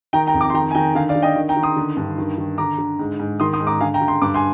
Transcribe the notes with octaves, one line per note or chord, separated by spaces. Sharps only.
D#3 G5 A#5
G5 A#5
F2
A#5 D6
C6
D#3 G5 A#5
G#5
D#3 G5 A#5
D3 F5 G#5
D5 F5
D3
D#5 G5
D#3
G5 A#5
D#3
C6 D#6
D3
G2
D#3
D#3
D3 A#5 D6
D3
G#2
G#2
D#3 C6 D#6
C6 D#6
G#2
A#5 D6
D3 F5 G#5
G5 A#5
D3
C6
G2 D6
G#5 C6